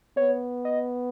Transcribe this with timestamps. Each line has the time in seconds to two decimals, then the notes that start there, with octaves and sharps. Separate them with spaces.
0.17 B3 C#5
0.65 D#5